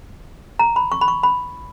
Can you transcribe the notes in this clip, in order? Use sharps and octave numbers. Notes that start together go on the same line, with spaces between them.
A#5
B5
C#6
B5
C#6
B5